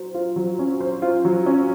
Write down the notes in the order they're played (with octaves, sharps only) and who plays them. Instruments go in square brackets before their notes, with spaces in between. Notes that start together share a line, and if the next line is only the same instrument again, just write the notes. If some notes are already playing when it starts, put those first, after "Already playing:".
Already playing: [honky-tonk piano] F#3 C5
F4
F#3
C#4
C5
F4
F#3
C#4